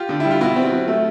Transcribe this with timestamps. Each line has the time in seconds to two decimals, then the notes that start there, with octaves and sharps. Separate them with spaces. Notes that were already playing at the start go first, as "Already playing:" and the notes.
Already playing: F4 G4
0.09 D3
0.20 G3 E4
0.31 F4
0.41 B2 E4 F#4
0.56 C4
0.72 F#3
0.88 A3